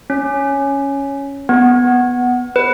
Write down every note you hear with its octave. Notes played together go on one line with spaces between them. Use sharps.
C#4
B3
B4